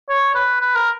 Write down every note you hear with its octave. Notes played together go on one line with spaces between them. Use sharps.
C#5
B4
B4
A#4